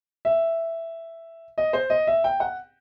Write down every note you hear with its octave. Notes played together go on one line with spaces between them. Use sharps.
E5
D#5
C5
D#5
E5
G5
F#5